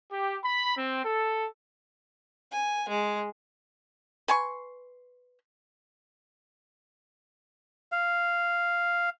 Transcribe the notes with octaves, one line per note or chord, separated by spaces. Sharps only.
G4
B5
C4
A4
G#5
G#3
B4 G#5 C6 C#6
F5